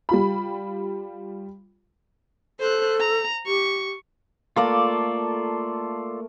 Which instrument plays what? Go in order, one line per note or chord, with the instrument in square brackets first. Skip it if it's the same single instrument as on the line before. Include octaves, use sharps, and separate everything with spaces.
[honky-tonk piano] G3 F4 B5
[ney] A4 [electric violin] C5 F#6
[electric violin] A#5
[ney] G4 [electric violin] C#6
[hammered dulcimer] A3 A#3 [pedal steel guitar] F4 A4 D5